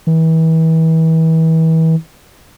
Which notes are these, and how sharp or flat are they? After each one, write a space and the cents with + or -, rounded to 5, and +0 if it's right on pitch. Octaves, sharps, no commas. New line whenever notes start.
E3 -35